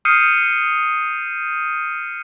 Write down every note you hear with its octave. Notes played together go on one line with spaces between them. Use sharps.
D#6 F6 G6 C7 C#7 D#7